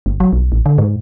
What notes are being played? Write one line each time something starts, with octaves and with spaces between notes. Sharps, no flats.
G1
F#3
B1
A1
D3
G#2